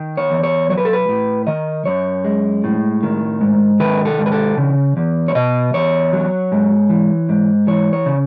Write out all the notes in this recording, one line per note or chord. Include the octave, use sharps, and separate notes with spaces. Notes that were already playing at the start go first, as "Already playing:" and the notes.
Already playing: D#3
C#5
E2
C#5
F#3 C#5
B4
A4
B4
A2
D#3 D#5
F#2 C#5
G#3
A2
D#3
G#2
D#3 B4
A4
G#2
B4
A4
C#3
E2
C#5
B2 D#5
E2 C#5
F#3
G#2
E3
G#2
E3 C#5
C#5
C#3